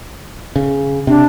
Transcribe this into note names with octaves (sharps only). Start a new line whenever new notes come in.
C#3
C3 D4